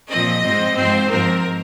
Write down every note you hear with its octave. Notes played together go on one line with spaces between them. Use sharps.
A#2 F3 C4 D#5
G#2 G#3 C4
G#2 F3 C4 C5
G#2 F3 C4 A#4